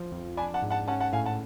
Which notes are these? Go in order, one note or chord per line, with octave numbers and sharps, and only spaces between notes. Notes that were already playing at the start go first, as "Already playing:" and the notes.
Already playing: F3
F2
D4 G#5 B5
F#5 A5
G#2
F#5 A5
C#4 F#5 A5
F#5 A5
A2 F5 G#5
F#5 A5